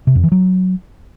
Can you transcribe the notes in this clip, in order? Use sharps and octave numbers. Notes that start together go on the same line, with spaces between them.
C3
F2
E3
F#3